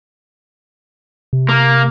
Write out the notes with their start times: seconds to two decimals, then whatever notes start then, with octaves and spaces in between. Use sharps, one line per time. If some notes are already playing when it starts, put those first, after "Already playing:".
1.33 C3
1.49 A#3